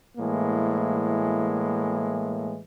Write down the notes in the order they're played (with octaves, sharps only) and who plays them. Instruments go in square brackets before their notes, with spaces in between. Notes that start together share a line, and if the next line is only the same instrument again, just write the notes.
[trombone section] A2 E3 G#3 A#3